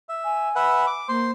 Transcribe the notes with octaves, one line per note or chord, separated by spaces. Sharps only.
E5
G#5
B4 E5 F#5
D6
A#3 C5 C6